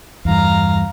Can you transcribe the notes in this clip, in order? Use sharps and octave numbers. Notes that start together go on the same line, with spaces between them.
E2 G2 F5 A#5